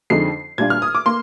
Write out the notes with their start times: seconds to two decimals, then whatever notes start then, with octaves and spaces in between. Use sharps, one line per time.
0.10 F2 D3 F3 G#3 D#4 C7
0.58 A#2 G3 D4 F4 G#6
0.70 F6
0.82 D#6
0.95 D6
1.06 A#3 C6